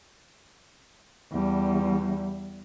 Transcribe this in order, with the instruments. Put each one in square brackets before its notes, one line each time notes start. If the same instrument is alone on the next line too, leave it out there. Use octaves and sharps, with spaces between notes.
[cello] E2 G3